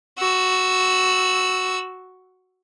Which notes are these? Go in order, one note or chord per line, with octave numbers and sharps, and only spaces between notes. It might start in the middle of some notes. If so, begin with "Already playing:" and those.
F#4 E6